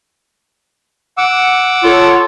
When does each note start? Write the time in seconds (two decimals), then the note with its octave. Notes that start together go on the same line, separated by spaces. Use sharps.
1.18 F#5 D6 E6
1.84 F4 A4 C#5